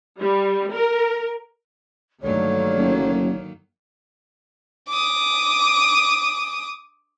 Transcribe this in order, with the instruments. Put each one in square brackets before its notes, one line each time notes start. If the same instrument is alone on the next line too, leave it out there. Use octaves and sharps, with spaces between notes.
[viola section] G3
A#4
[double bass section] G2 D3 A3 [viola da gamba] D#3 F#3 A#3 [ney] C#5
[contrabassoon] F#1
[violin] D6 D#6